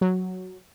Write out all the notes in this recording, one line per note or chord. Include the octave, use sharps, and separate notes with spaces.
F#3